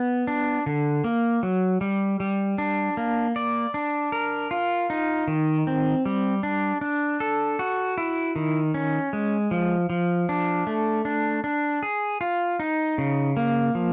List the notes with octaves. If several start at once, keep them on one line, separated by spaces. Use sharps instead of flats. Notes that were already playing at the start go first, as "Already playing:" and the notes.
Already playing: B3
D4
D3
A#3
F#3
G3
G3
D4
A#3
D5
D4
A#4
F4
D#4
D#3
C4
G3
D4
D4
A4
F#4
E4
D#3
C#4
G#3
F3
F3
D4
A3
D4
D4
G#4
F4
D#4
C#3
A#3
F3